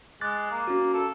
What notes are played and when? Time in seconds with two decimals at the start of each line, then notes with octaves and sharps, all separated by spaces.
0.21 G#3 D6 F#6 A6
0.51 A#3
0.68 C#4 F#4
0.94 A4